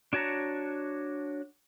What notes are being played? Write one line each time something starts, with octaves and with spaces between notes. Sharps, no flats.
D4 F#4 C#5 A5 A#5